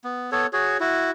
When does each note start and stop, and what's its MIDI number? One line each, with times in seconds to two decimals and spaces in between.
0.04 0.30 59
0.32 0.47 59
0.32 0.47 69
0.32 0.47 73
0.53 0.77 66
0.53 0.77 68
0.53 0.77 73
0.80 1.11 64
0.80 1.11 66